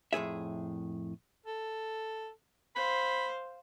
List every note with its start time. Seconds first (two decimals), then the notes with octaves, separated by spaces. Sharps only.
0.13 F2 A2 G#4 E5
1.46 A4
2.76 C5 F5 B5